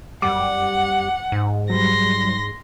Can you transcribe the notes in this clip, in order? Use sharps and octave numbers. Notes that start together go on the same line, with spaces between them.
F#2 G3 F#5 D6
G#2
F#3 G3 C6 A#6